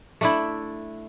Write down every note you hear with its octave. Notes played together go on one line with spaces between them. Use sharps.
A3 D4 E4